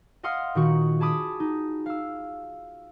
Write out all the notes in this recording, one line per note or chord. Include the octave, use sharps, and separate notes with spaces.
D#5 F5 F#5 C6 D#6 F6
A#2 D#3 F#4 C#6
G#4 A5 B5 D6 D#6
D#4
F5 E6